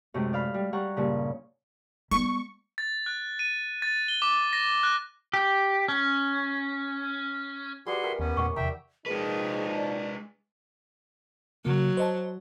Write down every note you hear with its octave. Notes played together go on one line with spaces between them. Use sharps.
F#2 A2 C3 G#3
D5 F5 B5
G3
G3 C#5 F#5 A#5
G2 A#2 C#3
G3 B3 C#6
A6
F#6
D#7
A6
G7
D6
A#6
F#6
G4
C#4
G3 F4 F#4 G#4 B4 C6
A#4 E5 G5
D#2 B3 C#4
E2 A#2 A3 F#5 C#6
E2 C3 D#3 E5 G5 A#5
A#2 F3 G#3 D#4 G#4 B4
D5
C#3 F#3 A#3
C5 D#5 A5